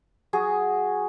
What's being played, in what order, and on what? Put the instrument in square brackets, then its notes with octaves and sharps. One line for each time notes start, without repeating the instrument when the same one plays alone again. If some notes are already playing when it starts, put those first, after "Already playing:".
[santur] F#3 F#4 G#4